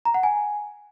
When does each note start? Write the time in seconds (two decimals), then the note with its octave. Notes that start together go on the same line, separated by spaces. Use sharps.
0.05 A#5
0.14 F#5
0.23 G#5